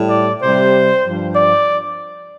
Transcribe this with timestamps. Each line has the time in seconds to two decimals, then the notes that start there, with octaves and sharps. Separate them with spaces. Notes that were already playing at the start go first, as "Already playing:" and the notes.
Already playing: A2 G3
0.10 D5
0.41 C3 G3 C5
1.03 G2 F3
1.34 D5